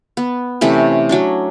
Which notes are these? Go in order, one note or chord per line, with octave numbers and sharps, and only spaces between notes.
B3
C3 E3 A3 C#4
F#3 C#4 D4